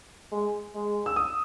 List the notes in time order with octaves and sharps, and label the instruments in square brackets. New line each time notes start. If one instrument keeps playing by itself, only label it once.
[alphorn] G#3
G#3
[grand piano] E6
D#6